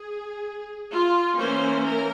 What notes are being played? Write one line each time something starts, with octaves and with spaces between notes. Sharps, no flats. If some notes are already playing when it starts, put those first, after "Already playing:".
Already playing: G#4
F4
E3 A#3 C#4 C5
A#4